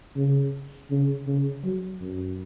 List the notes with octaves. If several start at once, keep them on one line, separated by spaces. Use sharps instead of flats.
C#3
C#3
C#3
F#3
F#2